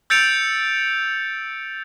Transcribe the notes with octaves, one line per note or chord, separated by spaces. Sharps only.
E6 G6 A6 C#7 D7 F7